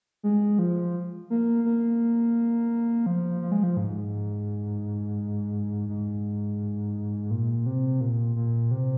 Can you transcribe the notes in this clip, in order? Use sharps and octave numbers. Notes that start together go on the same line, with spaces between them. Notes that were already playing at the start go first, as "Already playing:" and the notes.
G#3
F3
A#3
A#3
F3
F3
G#3
F3
G#2
G#2
A#2
C3
A#2
A#2
C3